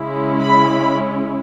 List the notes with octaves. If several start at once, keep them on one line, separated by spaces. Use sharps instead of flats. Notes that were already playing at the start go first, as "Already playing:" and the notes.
Already playing: C#3 G#3 C#4 E4
B5